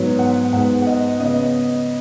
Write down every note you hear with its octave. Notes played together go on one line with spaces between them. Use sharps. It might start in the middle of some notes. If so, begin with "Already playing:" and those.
Already playing: G#2 F#3 B3
F#5
G#2 G#3 B3 F#5
F#5
D#5
C#3 B3 D#5